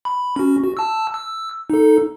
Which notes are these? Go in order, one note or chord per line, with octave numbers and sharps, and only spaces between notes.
B5
C#4 F#4
F#4
A5 E6
E6
D#4 A4